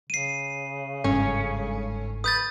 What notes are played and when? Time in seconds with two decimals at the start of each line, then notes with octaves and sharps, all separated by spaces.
0.10 C#3 C7 D#7
1.04 G1 G#2 C#4 A4
2.24 B4 D#6 G6 A6